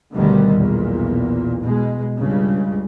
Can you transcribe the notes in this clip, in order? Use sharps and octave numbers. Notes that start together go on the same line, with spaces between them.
D2 G2 B2 D3 D#3 G3
B1 E2 A#2
B2 G#3
C#2 G2 C#3